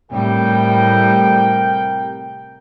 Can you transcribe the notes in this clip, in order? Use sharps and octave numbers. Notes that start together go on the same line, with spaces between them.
A2 C3 G3 A#4 G5